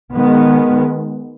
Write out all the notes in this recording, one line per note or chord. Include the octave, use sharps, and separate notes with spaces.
D#3 G#3 B3